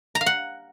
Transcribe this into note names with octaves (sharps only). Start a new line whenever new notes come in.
A#5
F5
F#5